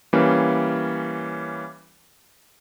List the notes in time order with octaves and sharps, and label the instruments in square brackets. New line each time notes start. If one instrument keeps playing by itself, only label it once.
[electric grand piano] E3 G3 A#3 C#4